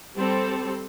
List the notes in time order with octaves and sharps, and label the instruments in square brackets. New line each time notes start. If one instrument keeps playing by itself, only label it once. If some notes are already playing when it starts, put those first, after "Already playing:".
[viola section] G3 C4 A4